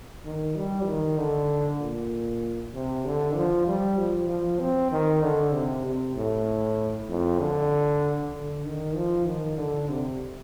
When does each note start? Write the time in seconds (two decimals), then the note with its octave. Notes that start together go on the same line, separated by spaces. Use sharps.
0.25 D#3
0.56 G3
0.87 D#3
1.18 D3
1.80 A#2
2.74 C3
3.05 D3
3.36 F3
3.68 G3
3.98 F3
4.29 F3
4.60 C4
4.92 D#3
5.23 D3
5.54 C3
5.85 C3
6.16 A2
7.09 F2
7.40 D3
8.34 D3
8.65 D#3
8.96 F3
9.26 D#3
9.58 D3
9.89 C3